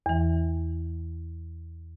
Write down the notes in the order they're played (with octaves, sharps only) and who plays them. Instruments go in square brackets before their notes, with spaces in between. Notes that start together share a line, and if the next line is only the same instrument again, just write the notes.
[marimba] E2 E3